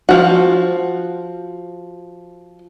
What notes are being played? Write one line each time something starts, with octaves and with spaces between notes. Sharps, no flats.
F3 F#4